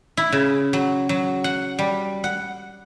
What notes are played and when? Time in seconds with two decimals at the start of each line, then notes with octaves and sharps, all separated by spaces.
0.17 E4
0.32 C#3
0.73 F#3
1.09 F#3
1.44 F#5
1.79 G3
2.24 F#5